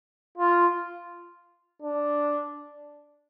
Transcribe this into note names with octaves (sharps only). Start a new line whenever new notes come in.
F4
D4